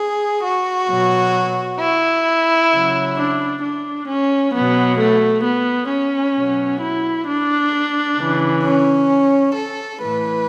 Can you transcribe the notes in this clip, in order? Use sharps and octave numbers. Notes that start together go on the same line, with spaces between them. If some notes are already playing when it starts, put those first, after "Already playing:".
Already playing: G#4
F#4
B2 F#3
E4
C#3 F#3
D4
D4
C#4
B2 F#3 B3
A3
B3
C#4
B2 F#3
E4
D4
C#3 E3
C#4
A4
A2 E3 B4